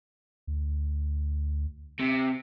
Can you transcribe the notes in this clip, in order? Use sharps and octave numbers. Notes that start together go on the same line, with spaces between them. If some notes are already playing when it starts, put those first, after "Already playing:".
D2
C3